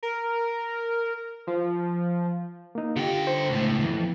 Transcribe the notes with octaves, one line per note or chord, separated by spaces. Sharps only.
A#4
F3
A#3 D#4
D3 F4 G4 G5
C5
C#2 A2
F2 E3 B3